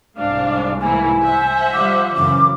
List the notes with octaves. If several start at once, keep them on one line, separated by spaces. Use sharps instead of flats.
C2 G#2 D4 F5
E3 A#3 E4 G#5
C5 E5 F#5
F3 G3 D6
F#2 C#3 E3 D6